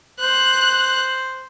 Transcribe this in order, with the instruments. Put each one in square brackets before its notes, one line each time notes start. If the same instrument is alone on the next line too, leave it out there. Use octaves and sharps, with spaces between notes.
[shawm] C5 [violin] F#6